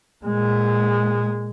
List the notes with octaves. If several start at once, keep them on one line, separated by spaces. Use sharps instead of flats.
A#2 G#3